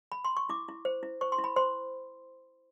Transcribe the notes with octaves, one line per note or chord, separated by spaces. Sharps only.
B5
C6
C#6
E4 D6
E4
C5
E4
C5 C#6
C6
E4
B5
C5 C6